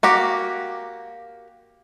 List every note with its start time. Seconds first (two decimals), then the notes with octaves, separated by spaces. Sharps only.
0.03 A#3 F#4 G4